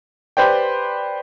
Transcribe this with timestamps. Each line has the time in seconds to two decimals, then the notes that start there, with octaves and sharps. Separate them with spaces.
0.37 G4 B4 C5 D5 G5